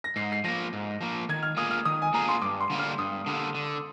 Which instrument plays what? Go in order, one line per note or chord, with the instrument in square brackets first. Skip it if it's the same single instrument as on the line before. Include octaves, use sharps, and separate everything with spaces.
[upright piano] A#6
[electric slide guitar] G#2 [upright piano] C7
[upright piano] C7
[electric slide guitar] F3 A#3 [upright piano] A#6
[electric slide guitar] G#2
F3 A#3
[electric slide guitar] D#3 [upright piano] G#6
[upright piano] F6
[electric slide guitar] A#3 F4 G#4 [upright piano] D#6
[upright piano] F6
[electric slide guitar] D#3 [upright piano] D#6
[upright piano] G#5
[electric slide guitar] A#3 F4 G#4 [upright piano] A#5
[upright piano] C6
[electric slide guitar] G2 [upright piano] D6
[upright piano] C6
[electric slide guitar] D3 G3 A#3
[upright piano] F6
[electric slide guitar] G2 [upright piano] D#6
[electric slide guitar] D3 G3 A#3
D3